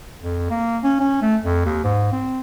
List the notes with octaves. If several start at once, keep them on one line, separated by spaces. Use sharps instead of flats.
F2
A#3
C#4
C#4
A3
F2
D#2
G#2
C4